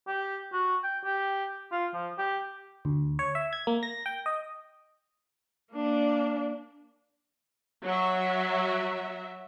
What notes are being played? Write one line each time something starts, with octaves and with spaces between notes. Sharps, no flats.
G4
F#4
G5
G4
F4
F3
G4
D2
C#5
E5
G#6
A#3
A#6
G5
D#5
A#3 D4
F#3 F#4 E5